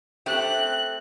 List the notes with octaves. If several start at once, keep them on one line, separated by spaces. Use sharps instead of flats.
A3 C4 G4 F#6